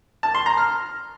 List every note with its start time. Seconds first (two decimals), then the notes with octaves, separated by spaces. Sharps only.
0.23 A5
0.35 C6
0.46 A#5
0.57 F6